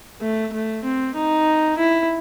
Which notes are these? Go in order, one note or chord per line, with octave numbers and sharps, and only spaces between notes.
A3
A3
C4
D#4
E4